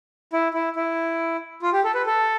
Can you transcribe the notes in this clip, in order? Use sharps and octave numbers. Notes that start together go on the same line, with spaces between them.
E4
E4
E4
F4
G4
A4
B4
A4